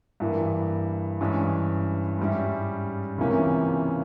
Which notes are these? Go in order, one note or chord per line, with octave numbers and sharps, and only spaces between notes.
G2 E3 A#3
G2 E3 G#3 C#4 E4
G#2 G3 C#4 E4
C#2 C3 E3 A#3 C#4